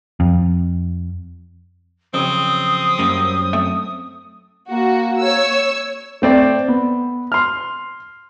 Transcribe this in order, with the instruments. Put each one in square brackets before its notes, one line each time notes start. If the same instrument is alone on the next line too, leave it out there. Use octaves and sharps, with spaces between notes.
[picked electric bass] F2
[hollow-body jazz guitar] F2 C#3 F#3 [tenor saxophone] C4 [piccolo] D#6
[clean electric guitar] F#2 [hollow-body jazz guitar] G3 A#3
[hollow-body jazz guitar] A3 C4 E5
[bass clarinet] A#3 [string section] F#4
[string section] C#5 E6
[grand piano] A3 C4 D5
B3
C6 F6